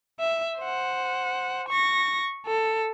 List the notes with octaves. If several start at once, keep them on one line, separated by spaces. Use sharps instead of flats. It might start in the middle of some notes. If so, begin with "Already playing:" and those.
E5
C5 F#5
C#6 A#6
A4